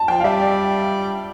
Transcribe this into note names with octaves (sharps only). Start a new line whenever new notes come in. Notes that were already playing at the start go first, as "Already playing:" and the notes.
Already playing: A5
F3 G5
F5
G3 E5
D5